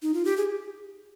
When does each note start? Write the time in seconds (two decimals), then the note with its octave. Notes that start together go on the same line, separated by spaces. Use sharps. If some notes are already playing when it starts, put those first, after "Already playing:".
0.02 D#4
0.14 F4
0.25 G4
0.37 G#4